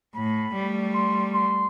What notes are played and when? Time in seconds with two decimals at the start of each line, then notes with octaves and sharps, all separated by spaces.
0.15 A2 B5
0.54 G3 A3
0.94 C6
1.33 C6